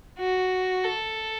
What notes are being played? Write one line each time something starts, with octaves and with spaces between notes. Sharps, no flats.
F#4
A4